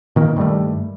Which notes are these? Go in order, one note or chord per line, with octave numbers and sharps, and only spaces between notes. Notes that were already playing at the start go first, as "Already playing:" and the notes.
A#2 D#3 A#3
G2 D#3 G3 A3